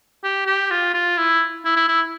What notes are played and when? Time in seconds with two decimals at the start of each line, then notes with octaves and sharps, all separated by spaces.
0.24 G4
0.47 G4
0.71 F4
0.94 F4
1.18 E4
1.65 E4
1.77 E4
1.89 E4